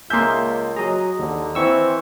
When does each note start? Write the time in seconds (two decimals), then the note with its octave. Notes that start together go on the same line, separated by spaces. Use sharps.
0.10 C#2 A#3 G#4 E5 C6 G6
0.76 F#3 G#4 D#5 A#5
1.19 D#2 D3
1.55 E3 C4 C#6 E6